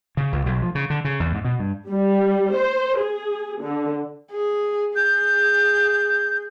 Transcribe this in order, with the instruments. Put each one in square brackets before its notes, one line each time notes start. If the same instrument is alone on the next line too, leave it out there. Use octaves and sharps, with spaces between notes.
[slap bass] C#3
C#2
B1
F3
C#3
D3
C#3
E2
G#2
B2
G2
[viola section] G3
C5
G#4
D3
[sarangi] G#4
[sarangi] G#4 [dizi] G6